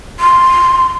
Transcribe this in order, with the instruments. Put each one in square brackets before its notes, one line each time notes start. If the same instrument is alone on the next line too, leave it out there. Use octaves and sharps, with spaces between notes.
[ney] C6